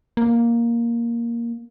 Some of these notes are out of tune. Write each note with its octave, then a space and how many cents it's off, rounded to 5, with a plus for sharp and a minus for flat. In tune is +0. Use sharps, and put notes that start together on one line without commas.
A#3 +5